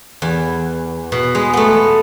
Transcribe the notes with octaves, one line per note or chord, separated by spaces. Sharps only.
E2
B2
G#3
A3 B3